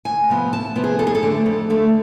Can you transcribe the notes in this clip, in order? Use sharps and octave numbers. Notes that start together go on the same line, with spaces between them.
D2 G#5
C3 F3 B3
D2 A5
C3 F3 B3
G#4
F2 A4
G#4
A4
D3 A3
F2
D3 A3